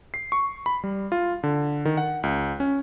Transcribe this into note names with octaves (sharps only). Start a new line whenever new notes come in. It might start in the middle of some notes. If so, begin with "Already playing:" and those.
C7
C#6
B5
G3
F4
D3
D#3
F#5
C#2
C#4